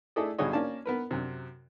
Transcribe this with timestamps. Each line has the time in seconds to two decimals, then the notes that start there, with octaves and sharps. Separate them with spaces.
0.16 A3 E4 G#4 A4 D5 D#5
0.38 B1 G2 D3 G#4 C#5 D#5
0.53 A#3 C#4 D5 A5
0.85 B3 A#4 B4
1.11 F#2 C3